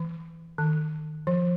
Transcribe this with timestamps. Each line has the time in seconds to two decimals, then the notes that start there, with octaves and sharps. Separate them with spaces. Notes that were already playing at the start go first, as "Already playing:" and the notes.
Already playing: E3
0.58 D#3
1.27 F3